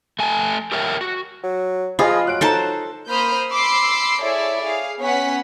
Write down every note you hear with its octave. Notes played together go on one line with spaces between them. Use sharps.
A3 G#5 A5
G4 A#4 C#5 E5 G5
F#4
F#3
F3 F4 G#4 D#5 B5
F#3 F#6 D7
D#4 A4 C5 A5 A#5
A#3 C5 B5 D#6 F6 G6
B5 C6 D6 E6 C7
E4 G#4 A4 C#5 D5 E5
G#4 F5
B3 C#4 C#5 F#5 B6